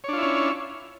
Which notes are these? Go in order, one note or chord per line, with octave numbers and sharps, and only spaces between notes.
C#4 D4 E4 F4 C#5